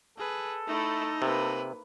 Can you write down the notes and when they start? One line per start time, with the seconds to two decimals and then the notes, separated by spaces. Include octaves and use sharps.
0.18 G#4 A4 B4
0.67 A3 D#4 E4
1.22 C3 A#3 B4